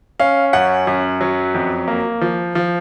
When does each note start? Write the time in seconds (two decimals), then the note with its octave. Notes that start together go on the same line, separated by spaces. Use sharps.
0.20 C#4 F5
0.53 F#2 F#5
0.87 F#2
1.21 F#3
1.54 F2
1.88 A#3
2.21 F3
2.55 F3